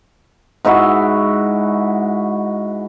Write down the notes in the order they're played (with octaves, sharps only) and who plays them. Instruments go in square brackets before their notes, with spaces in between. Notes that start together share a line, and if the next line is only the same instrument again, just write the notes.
[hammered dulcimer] G#2 D#4 E4 F#4